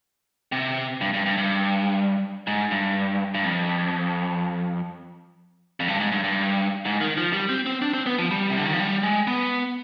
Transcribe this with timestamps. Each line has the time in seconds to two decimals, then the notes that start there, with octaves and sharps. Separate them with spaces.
0.52 C3
1.01 G2
1.14 G2
1.26 G2
1.38 G2
2.47 G#2
2.71 G2
3.35 G2
3.44 F2
5.80 F2
5.88 G2
6.00 G#2
6.12 G2
6.24 G2
6.85 G#2
7.01 D#3
7.17 F3
7.33 G3
7.49 C4
7.66 C4
7.82 D4
7.94 C4
8.06 B3
8.18 F3
8.31 G3
8.50 C3
8.57 D3
8.65 D#3
8.73 F3
8.79 G3
9.03 G#3
9.27 B3